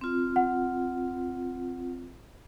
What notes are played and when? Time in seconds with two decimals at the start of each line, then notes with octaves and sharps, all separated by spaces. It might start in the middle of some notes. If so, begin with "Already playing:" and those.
0.01 C4 F4
0.36 F#5